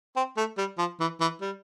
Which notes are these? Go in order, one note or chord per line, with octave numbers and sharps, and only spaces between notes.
C4
A3
G3
F3
E3
E3
G3